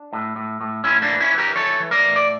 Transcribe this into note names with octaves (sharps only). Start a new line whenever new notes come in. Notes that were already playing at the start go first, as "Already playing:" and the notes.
Already playing: D4
A2
A2
A2
A2 C#4 E4
A#3 D4
E3
C#4 E4
E3
G4 A#4
E3 A4 C#5
E3
A#4 D5
A2
D5